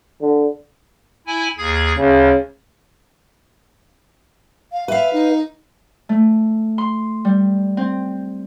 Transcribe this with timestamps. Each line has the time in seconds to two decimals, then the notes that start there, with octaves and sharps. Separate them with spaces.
0.21 D3
1.27 E4 G#5
1.58 D#2 G#4 G#6
1.97 D2 C#3
4.72 F5
4.88 B4 E5 F5
5.13 D#4
6.09 A3
6.78 C6
7.25 G3
7.77 C4